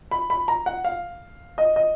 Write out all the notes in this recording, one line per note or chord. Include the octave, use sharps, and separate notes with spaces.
B5
B5
A#5
F#5
F5
D#5
D#5